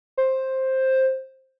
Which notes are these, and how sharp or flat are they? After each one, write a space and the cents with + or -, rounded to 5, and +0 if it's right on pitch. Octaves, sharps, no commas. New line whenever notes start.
C5 +10